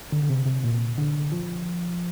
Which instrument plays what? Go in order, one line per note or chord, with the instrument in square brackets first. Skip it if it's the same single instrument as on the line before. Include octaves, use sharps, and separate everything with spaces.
[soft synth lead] D3
D3
C3
C3
A#2
D3
F3